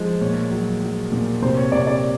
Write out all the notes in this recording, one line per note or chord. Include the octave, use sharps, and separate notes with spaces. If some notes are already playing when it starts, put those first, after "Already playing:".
Already playing: F3 G#3
A#2 C#5
F#3
F#3
A#2
C3 C5
C#5
C3 D5
D5